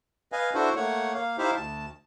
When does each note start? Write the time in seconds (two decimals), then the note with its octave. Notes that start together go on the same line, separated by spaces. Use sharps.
0.32 B4 D#5 F5 G#5
0.55 D4 E4 F#4 A4 C5
0.76 A3 A#3 C#5 F#5
1.14 A#3 F5
1.38 D#4 E4 G4 C5 E5 F5
1.56 D2 A5